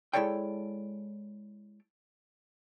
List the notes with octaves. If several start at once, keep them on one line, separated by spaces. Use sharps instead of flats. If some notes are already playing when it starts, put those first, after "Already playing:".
G#3 E4 A4 C#5 D5 G5